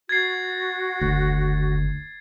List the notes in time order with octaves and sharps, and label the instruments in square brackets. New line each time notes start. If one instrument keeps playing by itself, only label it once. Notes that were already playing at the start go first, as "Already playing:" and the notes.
[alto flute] F#4 [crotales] G#6 A6 C7
[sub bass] F#1 [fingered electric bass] D2